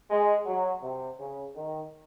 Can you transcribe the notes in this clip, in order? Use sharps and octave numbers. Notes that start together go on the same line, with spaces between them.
G#3
F#3
C3
C#3
D#3